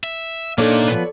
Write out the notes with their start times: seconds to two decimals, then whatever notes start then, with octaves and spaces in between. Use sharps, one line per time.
0.04 E5
0.58 A#2 A#3 D4 D#4 A4 C#5 D5
0.88 F3 B3 B4